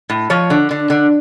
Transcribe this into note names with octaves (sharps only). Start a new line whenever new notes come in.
A2
F3 C#5
D3
D3
D3